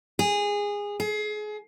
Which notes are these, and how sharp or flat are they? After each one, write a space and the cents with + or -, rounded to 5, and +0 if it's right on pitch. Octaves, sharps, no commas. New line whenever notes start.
G#4 -20
G#4 +30